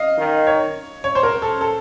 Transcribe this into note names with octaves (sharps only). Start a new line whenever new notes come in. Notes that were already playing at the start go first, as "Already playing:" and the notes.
Already playing: D#5 F5
D#3
C#5
C#5
C5
A#4
A4
A4